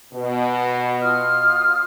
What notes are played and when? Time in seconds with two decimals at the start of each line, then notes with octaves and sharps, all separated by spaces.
0.13 B2
1.02 F4 D#6 F6